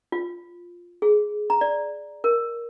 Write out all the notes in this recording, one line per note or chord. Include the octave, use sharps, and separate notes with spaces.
F4
G#4
A#5
D5
A#4